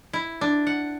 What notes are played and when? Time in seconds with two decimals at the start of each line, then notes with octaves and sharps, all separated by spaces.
0.13 E4
0.41 D4
0.67 F#5